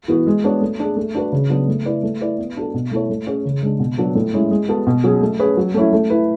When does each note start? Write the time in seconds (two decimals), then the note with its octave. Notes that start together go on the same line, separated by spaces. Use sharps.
0.08 E3 B3 F#4
0.27 G#3
0.44 B3 D4 F#4 C#5
0.61 A3
0.79 D4 G#4
0.97 A3
1.14 D4 F#4 B4
1.32 C#3
1.50 F#3 B3 D4
1.68 A3
1.85 E4 B4 D5
2.03 A3
2.21 E4 B4 D5
2.38 B3
2.57 D4 F#4 A4
2.74 B2
2.91 A3 E4 A4 C#5
3.10 A3
3.26 C#4 G#4 C#5
3.45 C#3
3.62 G#3 D4
3.80 B2
3.98 F#3 B3 D4
4.15 A2
4.34 G#3 C#4 E4
4.51 G#3
4.68 B3 F#4 A4
4.87 B2
5.04 F#3 C#4 G#4
5.21 A3
5.39 C#4 G#4 B4
5.57 F#3
5.74 A3 C#4 E4
5.93 A3
6.10 E4 B4